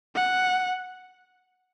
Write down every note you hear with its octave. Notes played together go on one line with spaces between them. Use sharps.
F#5